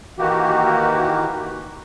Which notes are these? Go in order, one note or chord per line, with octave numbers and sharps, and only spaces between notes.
D#3 E3 A#3 F#4 G4